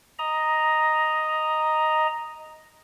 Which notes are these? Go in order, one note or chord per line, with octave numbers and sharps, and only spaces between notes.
D#5 A#5